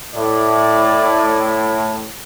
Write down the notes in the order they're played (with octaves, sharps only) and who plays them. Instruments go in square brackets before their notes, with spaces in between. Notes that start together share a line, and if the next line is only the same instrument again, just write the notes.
[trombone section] A2 [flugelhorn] D5